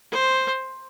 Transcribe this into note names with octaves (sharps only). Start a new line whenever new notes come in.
C5